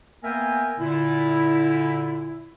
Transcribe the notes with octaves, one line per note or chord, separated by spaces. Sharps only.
A#3 B3 A#4 E5 G5 G#5
A#2 D3 E4